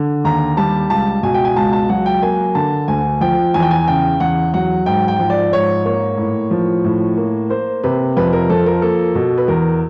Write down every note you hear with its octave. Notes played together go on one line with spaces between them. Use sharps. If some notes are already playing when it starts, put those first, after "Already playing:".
Already playing: D3
D#2 A#5
G3 A5
C#2 A5
B2 G#5
G5
G#5
C#2 A5
A5
F#3 F#5
G5
A#3 G#5
D3 A5
D2 G#5
F3 G5
E2 G#5
G5
G#5
C#3 G5
E2 F#5
F#3 F#5
G#2 G5
G5
F3
D5
G#2 C#5
A#3 C#5
A2
F3
A2
A#3
A#3 C5
C3 B4
F2 B4
A#4
F3 A4
A#4
A#3 A4
B2
B4
E2 A#4